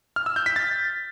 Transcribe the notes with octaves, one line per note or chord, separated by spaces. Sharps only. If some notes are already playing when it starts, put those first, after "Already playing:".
F6
E6
G6
B6
A6